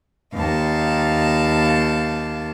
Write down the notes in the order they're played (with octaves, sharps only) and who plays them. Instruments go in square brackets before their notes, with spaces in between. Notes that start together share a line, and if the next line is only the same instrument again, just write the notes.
[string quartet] D#2 F5 A5